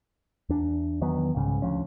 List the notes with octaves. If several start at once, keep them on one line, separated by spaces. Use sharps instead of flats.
E2 D4
E2 D#3 F#3 B3
C2 G#2 C#3
D2 F3 C#4